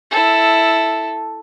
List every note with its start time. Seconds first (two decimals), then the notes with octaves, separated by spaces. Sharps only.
0.11 E4 A4